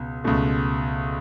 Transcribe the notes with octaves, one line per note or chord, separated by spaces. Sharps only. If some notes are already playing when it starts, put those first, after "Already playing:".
Already playing: C#2 B2
C#2 B2 A3